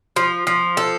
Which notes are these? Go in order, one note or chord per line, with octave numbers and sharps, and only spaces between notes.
F3
F3
A4